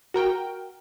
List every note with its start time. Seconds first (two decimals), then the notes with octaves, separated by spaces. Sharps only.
0.14 F#4 A#4 G5